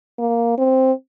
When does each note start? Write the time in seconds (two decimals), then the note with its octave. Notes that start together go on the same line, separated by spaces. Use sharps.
0.19 A#3
0.58 C4